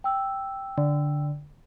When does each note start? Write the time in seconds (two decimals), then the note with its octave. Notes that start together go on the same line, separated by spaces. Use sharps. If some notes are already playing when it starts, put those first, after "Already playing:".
0.04 G5 E6
0.78 D3